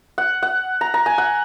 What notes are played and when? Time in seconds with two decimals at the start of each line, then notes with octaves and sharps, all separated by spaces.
0.18 F#5
0.43 F#5
0.81 A#5
0.94 A#5
1.06 G#5
1.18 F#5